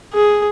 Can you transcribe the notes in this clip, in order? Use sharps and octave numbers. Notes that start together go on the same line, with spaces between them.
G#4